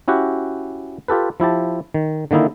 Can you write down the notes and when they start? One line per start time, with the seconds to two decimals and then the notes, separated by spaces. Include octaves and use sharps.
0.08 C#4 E4 F#4 G4 F#5
1.08 F4 G4 A4 B4
1.40 F3 E4 G4 A5
1.94 D#3
2.31 D3 D#3 A#3 D#4 E4